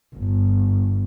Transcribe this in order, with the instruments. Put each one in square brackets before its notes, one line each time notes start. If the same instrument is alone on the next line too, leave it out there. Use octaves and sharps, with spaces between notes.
[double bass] G1